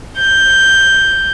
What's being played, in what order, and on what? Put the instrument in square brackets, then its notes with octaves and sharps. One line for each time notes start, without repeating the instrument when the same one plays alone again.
[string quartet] G6